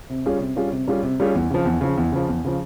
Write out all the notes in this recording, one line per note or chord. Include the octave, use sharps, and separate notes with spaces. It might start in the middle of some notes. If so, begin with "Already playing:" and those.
C3
G3 C#4 F4 G#4
C3
G3 C#4 F4 G#4
C3
G3 C#4 F4 G#4
C3
G3 C#4 F4 G#4
E2
C#3 F3
E2
C#3 F3
E2
C#3 F3
E2
C#3 F3